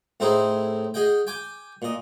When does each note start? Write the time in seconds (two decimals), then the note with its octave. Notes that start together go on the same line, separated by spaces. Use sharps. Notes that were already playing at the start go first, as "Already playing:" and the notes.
0.20 A2 C4 D#4 E4 G#4
0.94 G#4 D#5 F#5 G5
1.27 G5 G#5 D6
1.82 A#2 D#5